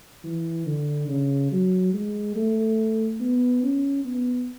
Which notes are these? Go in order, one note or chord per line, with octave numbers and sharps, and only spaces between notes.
E3
D3
C#3
F#3
G#3
A3
B3
C#4
B3